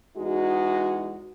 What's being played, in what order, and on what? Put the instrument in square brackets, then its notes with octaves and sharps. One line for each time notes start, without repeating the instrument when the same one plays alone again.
[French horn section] E2 G#3 D#4 F#4